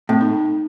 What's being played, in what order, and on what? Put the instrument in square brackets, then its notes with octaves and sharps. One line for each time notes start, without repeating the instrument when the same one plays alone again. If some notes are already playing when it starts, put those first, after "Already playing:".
[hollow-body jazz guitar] A2 [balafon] C4
[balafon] D#4